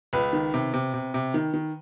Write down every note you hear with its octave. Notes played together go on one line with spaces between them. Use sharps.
C#2 B4
D#3
C3
C3
C3
C3
D#3
D#3